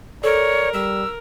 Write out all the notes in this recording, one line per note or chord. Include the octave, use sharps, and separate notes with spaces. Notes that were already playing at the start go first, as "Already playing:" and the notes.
A4 A#4 C#5 D5
G3 E6